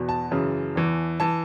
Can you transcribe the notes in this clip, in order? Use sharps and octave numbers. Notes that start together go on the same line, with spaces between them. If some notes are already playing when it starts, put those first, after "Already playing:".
Already playing: E2 B2
A5
F#2 C#3 E3
E2 E3
E3 A5